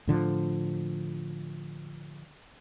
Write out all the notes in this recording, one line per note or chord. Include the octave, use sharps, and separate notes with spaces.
A2 D3 F3